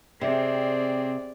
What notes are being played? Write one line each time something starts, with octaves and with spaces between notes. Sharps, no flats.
C3 C4 G#4 D5